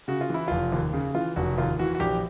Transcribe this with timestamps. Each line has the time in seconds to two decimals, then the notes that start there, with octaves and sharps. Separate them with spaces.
0.08 C#3 F#4
0.21 F4
0.30 E3 E4
0.48 F1 F4
0.72 D#2
0.93 C#3
1.14 E3 F4
1.36 F1 F#4
1.58 D#2 F4
1.79 E3 F#4
1.95 F#4
2.00 A#1 G4